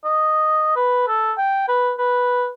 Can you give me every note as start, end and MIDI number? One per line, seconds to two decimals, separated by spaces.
0.05 0.72 75
0.76 1.03 71
1.08 1.33 69
1.38 1.67 79
1.68 1.93 71
1.98 2.48 71